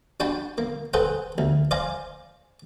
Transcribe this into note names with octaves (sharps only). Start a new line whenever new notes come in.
D4 F#4 G5 A5 B5
A#3
G#4 A4 B4 C5 F#5 G5
D2
C5 D5 F5 G#5 A#5